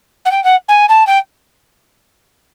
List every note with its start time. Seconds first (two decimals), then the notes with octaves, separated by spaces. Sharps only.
0.25 F#5
0.31 G5
0.44 F#5
0.68 G#5
0.88 A5
1.07 G5